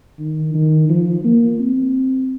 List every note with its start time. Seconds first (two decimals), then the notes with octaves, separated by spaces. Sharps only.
0.19 D#3
0.54 D#3
0.89 F3
1.24 A#3
1.59 C4